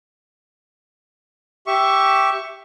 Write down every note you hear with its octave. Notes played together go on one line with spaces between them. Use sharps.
G4 E5 C#6